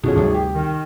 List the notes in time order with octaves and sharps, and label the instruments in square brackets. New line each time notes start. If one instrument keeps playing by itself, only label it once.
[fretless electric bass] G2 B2 [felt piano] D3 F3 C#4 [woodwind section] F#4 G#4
[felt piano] G#1 [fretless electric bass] D2 C3 G3
[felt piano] G4
[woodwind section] D#3